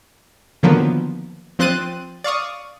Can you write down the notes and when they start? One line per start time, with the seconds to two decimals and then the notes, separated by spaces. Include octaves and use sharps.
0.63 D3 D#3 F3 F#3 A#3 B3
1.59 F3 C4 C5 F#6 A6 D#7
2.24 D5 F5 C#6 D#6